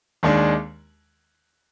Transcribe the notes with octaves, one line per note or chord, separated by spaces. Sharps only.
D#2 D#3 G#3 D4